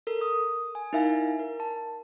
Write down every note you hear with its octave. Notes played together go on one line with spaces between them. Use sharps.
A4 A#4
D#6
G#5
D#4 E4 A#4 E5 F5 G#5
A#4
A5